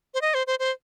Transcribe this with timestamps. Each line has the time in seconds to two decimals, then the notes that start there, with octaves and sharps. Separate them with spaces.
0.14 C5
0.21 D#5
0.34 C5
0.47 C5
0.59 C5